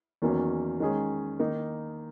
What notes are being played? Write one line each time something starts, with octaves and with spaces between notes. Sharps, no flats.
E2 D#3 F#3 A#3 C#4
D#3 G#3 C#4 G#4
D#3 A#3 D#4